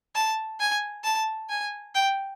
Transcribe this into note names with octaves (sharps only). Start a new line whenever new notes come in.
A5
G#5
A5
G#5
G5